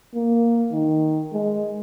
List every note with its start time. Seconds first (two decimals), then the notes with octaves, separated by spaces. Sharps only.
0.14 A#3
0.72 D#3
1.33 G#3